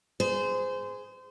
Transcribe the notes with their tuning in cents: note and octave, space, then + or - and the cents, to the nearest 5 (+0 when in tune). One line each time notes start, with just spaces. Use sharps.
G#4 +0 C5 -25